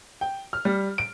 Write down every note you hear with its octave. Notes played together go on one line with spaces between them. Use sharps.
G5
F6
G3
D7